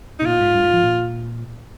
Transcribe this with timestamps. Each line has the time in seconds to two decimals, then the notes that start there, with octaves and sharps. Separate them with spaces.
0.19 D#4
0.22 C3
0.26 A#2 F4
0.41 G#2
0.55 G2
0.64 G#2
0.74 F3
0.83 A#2